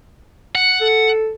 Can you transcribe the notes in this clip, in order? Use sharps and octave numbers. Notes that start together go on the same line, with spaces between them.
F#5
A4